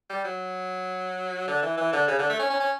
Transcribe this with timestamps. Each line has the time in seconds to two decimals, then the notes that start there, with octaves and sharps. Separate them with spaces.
0.10 G3
0.24 F#3
1.48 D3
1.62 E3
1.77 E3
1.93 D3
2.08 C#3
2.19 D3
2.29 A3
2.39 C#4
2.50 C#4
2.60 C#4